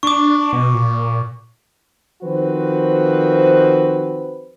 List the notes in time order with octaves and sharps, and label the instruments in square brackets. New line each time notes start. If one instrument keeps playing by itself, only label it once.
[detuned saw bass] D4 [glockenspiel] C#6 D6
[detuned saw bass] B2
A#2
[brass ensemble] D#3 F3 C4 F#4 B4 C5